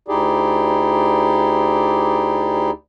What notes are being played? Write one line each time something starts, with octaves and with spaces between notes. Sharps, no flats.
D2 D#4 E4 G4 G#4 D5